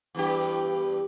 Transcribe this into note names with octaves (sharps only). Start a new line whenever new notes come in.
E2 G2 G4